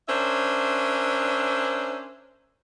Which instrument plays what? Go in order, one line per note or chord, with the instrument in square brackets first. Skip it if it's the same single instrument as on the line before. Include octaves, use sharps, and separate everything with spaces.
[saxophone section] C#4 D4 A#4 C5 E5